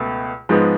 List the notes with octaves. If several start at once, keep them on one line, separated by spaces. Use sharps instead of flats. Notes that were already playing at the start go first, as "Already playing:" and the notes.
Already playing: C#2 B2 A3
G#2 F3 G#3 B3